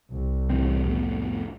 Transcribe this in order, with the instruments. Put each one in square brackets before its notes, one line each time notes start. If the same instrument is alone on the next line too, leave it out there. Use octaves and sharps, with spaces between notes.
[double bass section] C2
[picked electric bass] A2 E3 C4
F2 A2 B3